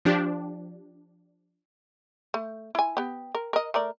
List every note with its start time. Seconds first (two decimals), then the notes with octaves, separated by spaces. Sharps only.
0.05 F3 D4 G4
2.34 A3
2.75 E4 G#5
2.97 B3 G4
3.35 A#4
3.53 A#4 D#5
3.74 A3 A#4 D5